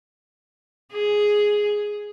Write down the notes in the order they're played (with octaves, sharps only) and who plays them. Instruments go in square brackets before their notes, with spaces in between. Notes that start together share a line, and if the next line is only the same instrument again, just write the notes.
[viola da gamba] G#4